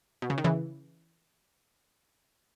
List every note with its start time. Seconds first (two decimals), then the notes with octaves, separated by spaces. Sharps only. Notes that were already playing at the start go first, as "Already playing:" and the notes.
0.22 B2
0.30 C#3
0.38 D#3
0.44 C#3 E3